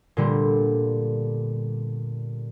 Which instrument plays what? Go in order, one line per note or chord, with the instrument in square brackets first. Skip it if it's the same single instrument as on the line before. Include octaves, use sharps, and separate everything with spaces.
[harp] A#2 D3 G3 B3